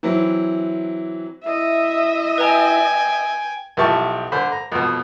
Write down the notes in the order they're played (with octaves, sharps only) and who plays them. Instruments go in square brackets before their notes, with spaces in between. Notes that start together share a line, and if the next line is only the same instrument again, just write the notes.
[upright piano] E3 F#3 C4 E4
[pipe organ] E4 [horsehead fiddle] D#5 E5
[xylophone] B4 A#5 [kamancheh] G5 G#5
[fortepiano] B1 F3 E4 G4 A5 C#6
D3 C5 B5
A#5
F2 B2